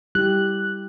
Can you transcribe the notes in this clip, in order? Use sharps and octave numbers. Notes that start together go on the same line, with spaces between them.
G3 E4 G4 F#6